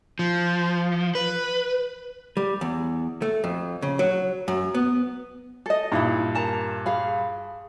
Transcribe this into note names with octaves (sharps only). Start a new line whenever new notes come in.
F3
B4
G3
E2
A3
F2
C#3
F#3
F#2
B3
A4 D#5
G2 A#2 D#4 E4 B5
A#4 A5 A#5
G#4 F5 B5